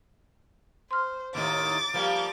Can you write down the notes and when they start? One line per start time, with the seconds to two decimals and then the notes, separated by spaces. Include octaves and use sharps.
0.91 C5 C6 F6
1.35 D#2 A2 D#3 D6 A6
1.94 F3 G3 A#3